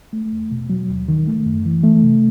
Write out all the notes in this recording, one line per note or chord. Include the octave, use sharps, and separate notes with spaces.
A3
E2
B2
F#3
D#2
D#3
A3
F#2
E3
A3
C3